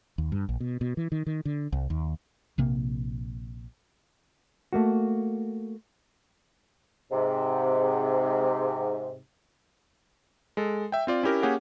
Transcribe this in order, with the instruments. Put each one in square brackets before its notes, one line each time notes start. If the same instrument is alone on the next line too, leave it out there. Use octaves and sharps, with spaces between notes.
[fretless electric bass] D#2
G2
A#1
B2
B2
E3
D#3
D#3
D3
C2
D#2
A#1 C3 A#3
[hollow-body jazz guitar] A3 A#3 F#4
[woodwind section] G#2 C3
[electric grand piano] G#3 A4
E5 G5
C4 F4 D5
C#4 E4 G4 A#4
A#3 C#4 G4 G#4 C#5 F#5